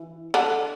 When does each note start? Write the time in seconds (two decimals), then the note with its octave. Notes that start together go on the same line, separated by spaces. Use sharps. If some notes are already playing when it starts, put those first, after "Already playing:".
Already playing: E3
0.34 D3 D4